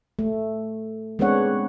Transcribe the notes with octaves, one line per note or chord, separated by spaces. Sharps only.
A3
G#3 B3 C4 D4 C#5 F#5